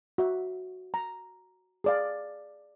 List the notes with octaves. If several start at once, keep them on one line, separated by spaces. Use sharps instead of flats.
F#4 E5
A#5
G#4 D5 F5